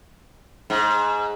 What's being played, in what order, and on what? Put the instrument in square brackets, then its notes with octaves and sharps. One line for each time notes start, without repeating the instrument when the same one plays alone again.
[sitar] G#2